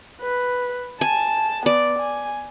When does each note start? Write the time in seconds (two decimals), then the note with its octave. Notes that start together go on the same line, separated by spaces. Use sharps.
0.21 B4
1.01 G#5 A5
1.66 B3 D5
1.99 G#5